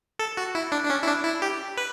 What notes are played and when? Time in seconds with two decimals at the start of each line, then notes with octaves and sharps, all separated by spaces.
0.19 A4
0.37 F#4
0.55 E4
0.72 D4
0.85 D4
0.90 C#4
1.03 E4
1.07 D4
1.25 E4
1.42 G4
1.77 B4